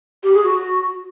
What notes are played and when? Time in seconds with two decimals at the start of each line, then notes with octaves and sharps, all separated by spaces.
0.24 G4
0.34 G#4
0.44 F#4